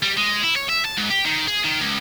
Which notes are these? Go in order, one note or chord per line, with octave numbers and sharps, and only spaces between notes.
G3
G#3
E4
C#5
E5
A5
G#2
G4
D#3
G#4
D#3
C#2